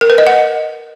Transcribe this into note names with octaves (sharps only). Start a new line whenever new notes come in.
A#4
B4
D#5
F#5